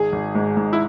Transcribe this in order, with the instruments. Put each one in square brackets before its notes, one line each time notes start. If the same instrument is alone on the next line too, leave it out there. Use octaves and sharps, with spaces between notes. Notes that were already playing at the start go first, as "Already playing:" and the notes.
Already playing: [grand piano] G#1 G#4
G#1
G#2
G#2
E4